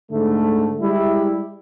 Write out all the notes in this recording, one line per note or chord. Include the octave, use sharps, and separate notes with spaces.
G#2 D3 A3
G3 G#3 E4